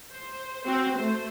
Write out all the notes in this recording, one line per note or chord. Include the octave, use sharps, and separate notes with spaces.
C5
C4 F#4 C5
A3 C5